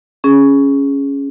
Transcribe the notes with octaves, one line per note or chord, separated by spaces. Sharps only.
C#4 G#4